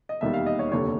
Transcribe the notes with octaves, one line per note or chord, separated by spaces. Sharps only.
D#5
E1 D#2 D#3 G3 E5
F5
D#5
C#5
F1 D#2 D3 C#5